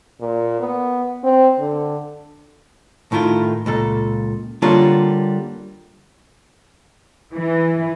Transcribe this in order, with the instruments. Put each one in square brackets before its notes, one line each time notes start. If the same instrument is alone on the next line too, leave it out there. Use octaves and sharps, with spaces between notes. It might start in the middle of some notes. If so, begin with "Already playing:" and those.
[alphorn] A#2
B3
C4
D3
[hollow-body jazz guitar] A2 D#3 E4 F4
C#2 A#2 A4
D3 G3 A#3 F4 C#5
[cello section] E3